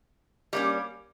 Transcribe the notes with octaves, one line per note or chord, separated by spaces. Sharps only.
G3 A#3 C#4